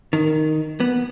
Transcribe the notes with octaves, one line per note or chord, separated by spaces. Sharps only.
D#3
B3